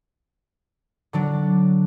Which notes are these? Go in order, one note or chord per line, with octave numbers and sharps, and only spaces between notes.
D3 F#3 D4